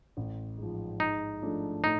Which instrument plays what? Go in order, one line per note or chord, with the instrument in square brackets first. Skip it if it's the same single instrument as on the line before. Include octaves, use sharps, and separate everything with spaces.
[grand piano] A1
G#2 F3
[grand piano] G#2 [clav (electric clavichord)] D#4
[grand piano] F3 A3 D4
[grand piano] A2 [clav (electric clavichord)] D#4